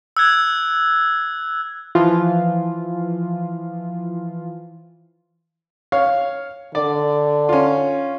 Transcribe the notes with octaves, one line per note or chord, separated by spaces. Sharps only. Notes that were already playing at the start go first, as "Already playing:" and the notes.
E6 F#6 G#6
E3 F3 F4
C#5 F5
D3 D5
C#4 F4